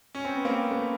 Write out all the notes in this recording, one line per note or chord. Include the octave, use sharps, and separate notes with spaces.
C#4
C4
B3
A#3 C4
A3 B3